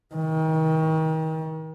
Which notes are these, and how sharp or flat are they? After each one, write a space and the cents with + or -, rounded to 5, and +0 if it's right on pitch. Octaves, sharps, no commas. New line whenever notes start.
D#3 +35